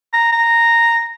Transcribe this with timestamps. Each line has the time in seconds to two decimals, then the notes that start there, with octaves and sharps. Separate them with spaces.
0.13 A#5
0.32 A#5